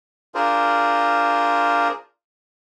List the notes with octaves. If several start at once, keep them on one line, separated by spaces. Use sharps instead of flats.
D4 F4 G#4 A#4 C5